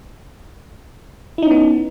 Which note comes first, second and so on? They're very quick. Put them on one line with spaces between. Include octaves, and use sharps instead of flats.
E4 D#4 C#4 B3